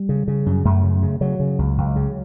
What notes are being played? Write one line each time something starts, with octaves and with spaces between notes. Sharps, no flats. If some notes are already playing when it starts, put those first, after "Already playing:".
Already playing: G3
C#3
C#3
F#2
F#2 A3
C#3
C#3
C#3 F#3
C#3
C#2
C#2
C#3